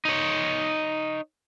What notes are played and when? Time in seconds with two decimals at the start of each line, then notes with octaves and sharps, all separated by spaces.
0.05 D#4 C#5